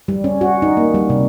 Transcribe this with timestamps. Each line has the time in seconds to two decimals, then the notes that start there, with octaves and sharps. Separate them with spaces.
0.08 G3
0.24 C#4
0.41 F#4
0.62 D#4
0.77 A#3
0.94 G3
1.10 C3